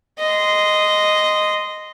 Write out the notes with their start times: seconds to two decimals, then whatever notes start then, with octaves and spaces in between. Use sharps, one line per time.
0.19 D#5 C6